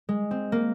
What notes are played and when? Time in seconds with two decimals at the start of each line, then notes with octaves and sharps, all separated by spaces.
0.09 G#3
0.31 C4
0.52 A#3